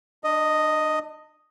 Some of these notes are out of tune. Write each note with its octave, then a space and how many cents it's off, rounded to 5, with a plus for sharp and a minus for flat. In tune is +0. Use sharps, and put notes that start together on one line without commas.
D4 +35 D#5 +0